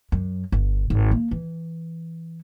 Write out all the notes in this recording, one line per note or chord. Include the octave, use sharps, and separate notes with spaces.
F#2
G1
G#1
A#3
E3